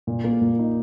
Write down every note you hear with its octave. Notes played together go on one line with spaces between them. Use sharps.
A#2
A#3
A#2
D#4